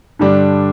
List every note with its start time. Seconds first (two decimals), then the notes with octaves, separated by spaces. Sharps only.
0.19 G2 D3 G3 D4